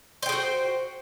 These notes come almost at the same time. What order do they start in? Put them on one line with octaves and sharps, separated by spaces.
C5 G5 G#4 F#4